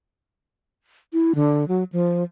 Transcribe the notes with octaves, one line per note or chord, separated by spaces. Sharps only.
E4
D3
F#3
F3